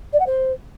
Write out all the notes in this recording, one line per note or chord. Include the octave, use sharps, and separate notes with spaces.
D5
F#5
C5